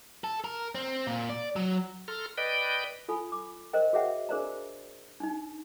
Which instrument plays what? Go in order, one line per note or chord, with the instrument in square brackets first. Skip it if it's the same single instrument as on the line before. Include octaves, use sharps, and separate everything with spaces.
[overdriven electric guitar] A4
A#4
C4
A#2
D5
F#3
[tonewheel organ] A4 A#5 C6 F6
B4 D5 D#5 G5
[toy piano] F4 A4 G#5 B5
D6
A#4 C5 D#5 G5
F#4 G#4 C#5 E5 F#5 G5
D4 G#4 A#4 C5 D5 A#5
D4 D#4